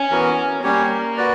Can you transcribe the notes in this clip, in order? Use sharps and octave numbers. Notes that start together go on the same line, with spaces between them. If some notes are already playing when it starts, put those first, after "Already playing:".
Already playing: C#4
E3 B3 F#4 A#4
G3 A#3 C#4 G4 C#5
F#4 B4 D5